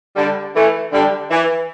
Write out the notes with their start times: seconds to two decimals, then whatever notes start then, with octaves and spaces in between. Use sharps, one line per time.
0.16 D3 G3
0.54 E3 A3
0.92 D3 G3
1.31 E3